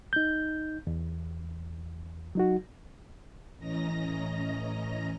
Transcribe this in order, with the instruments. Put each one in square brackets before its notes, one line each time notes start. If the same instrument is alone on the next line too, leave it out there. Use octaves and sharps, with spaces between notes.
[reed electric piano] D#4 G6
E2
F#3 D#4 F#4
[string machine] A2 E3 C#4 D#5 A#5 A#6